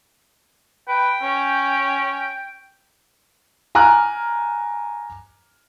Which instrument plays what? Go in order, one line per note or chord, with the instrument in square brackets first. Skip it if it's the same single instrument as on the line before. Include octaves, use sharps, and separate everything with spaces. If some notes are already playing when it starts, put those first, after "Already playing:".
[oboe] B4 [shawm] G5
[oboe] C#4
[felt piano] G#5 A#5 D6 F6 F#6